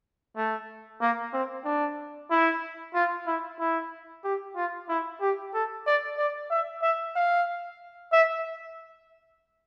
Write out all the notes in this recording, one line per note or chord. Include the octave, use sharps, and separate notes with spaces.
A3
A#3
C4
D4
E4
F4
E4
E4
G4
F4
E4
G4
A4
D5
D5
E5
E5
F5
E5